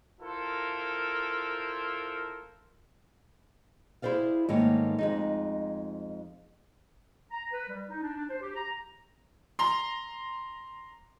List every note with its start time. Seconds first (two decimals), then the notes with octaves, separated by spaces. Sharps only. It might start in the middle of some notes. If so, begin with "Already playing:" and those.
0.21 E4 F4 A4 A#4 C5
4.02 E4 G#4 C5 D5 F5
4.49 G#2 D#3 A3 A#3 C#5
4.99 F2 G#3 D#4
7.31 A#5
7.51 B4
7.69 G3
7.89 D#4
8.03 D4
8.16 D4
8.30 C5
8.41 G4
8.55 A#5
9.59 A#5 C6